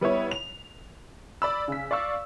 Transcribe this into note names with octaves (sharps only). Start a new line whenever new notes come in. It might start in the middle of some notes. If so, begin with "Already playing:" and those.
G3 B3 E4 C#5
F7
D5 B5 E6
C#3 B6
D5 F5 C#6 E6